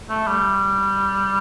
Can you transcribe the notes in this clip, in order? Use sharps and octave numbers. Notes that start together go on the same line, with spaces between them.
A3
G3